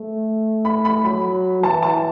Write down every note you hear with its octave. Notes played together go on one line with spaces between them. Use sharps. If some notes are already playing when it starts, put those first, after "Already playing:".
Already playing: A3
B5
B5
F#3 B5
E3 A5
A5